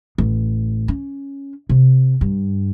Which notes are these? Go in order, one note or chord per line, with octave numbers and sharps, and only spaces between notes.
A1
C#4
C3
G2